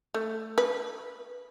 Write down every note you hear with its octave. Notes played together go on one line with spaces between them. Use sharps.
A3
B4